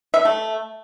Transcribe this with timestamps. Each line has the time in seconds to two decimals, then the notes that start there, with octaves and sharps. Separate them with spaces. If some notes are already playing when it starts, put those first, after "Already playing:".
0.14 E5
0.25 A3